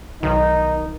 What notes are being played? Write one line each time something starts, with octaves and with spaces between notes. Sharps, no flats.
B1 D#3 D#4